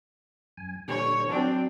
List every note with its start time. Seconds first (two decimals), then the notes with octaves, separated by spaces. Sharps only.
0.57 F#2 G#5
0.88 A#2 D3 G3 C#5
1.29 F#3 C4 D4